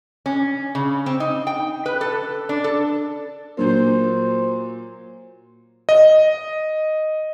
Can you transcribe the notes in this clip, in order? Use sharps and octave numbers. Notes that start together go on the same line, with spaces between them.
C#4
C#3
C4
D#4
G5
B4
A4
D4
A4
A#2 F#3 A#3 C5
D#5